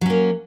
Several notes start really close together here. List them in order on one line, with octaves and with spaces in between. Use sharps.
F#3 C#4 A#3